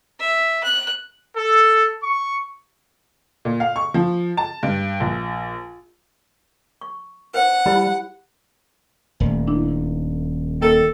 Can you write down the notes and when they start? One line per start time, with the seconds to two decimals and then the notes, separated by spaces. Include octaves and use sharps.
0.20 E5
0.64 F#6
1.37 A4
2.03 C#6
3.45 A#2
3.60 F5
3.76 C#6
3.94 F3
4.37 A5
4.63 G2
5.00 A#1
6.81 C#6
7.34 B4 C5 F#5
7.66 G3 E4 G4 B5
9.20 D#1 E2 A3
9.47 D4 E4
10.62 D#3 A#3 A4